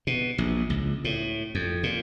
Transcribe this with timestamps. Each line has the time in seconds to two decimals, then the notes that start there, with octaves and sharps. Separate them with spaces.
0.07 B2
0.38 A#1
0.70 C#2
1.05 A2
1.55 F2
1.83 A#2